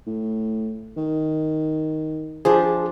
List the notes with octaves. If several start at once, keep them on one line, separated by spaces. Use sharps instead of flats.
A2
D#3
F3 D4 G4 G#4